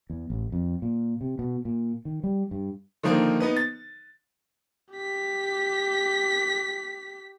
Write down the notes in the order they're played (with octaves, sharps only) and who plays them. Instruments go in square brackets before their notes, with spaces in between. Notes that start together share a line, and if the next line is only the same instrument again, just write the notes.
[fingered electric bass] E2
A1
F2
A#2
C3
B2
A#2
D#3
G3
G2
[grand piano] D3 D#3 F3 A#3 D#4 A#4
B3 D#4 B4
A6
[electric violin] G4 B6